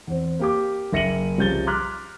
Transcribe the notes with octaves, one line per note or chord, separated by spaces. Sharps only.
E2 C4
A#3 G4 D6
F#1 E5 A#6 C#7 D#7 F#7
C2 C#3 F3 G6 A6 G7
A#5 C6 D6 F6 F#6 B6